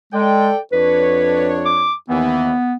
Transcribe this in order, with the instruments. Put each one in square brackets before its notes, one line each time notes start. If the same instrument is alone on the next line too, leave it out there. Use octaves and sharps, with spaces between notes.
[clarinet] G#3 [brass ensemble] A4 D5 G5
[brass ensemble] F2 D4 C#5 [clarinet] B4
[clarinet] D6
[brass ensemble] D#2 E3 [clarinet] B3